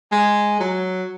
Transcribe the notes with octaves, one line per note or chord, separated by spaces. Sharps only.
G#3
F#3